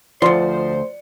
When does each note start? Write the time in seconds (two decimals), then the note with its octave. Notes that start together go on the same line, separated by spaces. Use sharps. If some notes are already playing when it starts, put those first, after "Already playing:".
0.22 D2 F3 C5 D5 C6 C#7